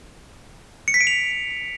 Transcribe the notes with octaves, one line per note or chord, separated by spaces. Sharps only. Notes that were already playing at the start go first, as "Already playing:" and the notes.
C#7
B6
D7
F7